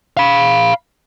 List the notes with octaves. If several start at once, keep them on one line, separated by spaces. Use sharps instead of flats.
F5 B5